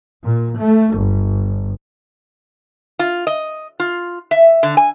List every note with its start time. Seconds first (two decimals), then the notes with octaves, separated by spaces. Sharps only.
0.22 A#2
0.57 A3
0.96 G1
2.99 F4
3.27 D#5
3.80 F4
4.31 E5
4.63 D3
4.77 G#5